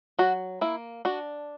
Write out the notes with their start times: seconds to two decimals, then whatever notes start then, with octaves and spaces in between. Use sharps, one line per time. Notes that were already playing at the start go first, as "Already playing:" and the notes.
0.19 F#3 F#4
0.61 A#3 E4
1.05 D4 F#4